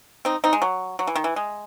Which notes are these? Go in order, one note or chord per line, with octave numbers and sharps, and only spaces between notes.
C4 D#4
C4 D#4
G#3
F#3
F#3
E3
D#3
E3
G#3